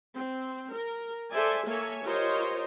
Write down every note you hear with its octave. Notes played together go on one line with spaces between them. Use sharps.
C4
A#4
A4 C5 D5 E5 G#5
A#3 A4 C#5 E5 G#5
F4 G4 A#4 C5 C#5 D#5